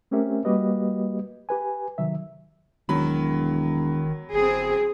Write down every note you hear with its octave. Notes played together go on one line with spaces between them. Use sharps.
A3 C4 C#4 G4 A#4 E5
G3 A#3 F#4 G4 B4 D#5
G4 B4 G#5
C3 D#3 F#3 E5
E1 D#3 F#3 B5
G1 C4 G#4